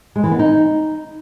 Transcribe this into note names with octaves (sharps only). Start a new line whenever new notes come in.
G#3
E3
B3
D#4